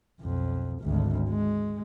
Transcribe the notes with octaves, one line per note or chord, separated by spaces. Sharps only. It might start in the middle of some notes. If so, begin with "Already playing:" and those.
B1 F2
G#1 D2
G#3